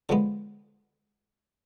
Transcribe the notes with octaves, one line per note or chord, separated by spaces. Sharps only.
D3 F3 G#3 B3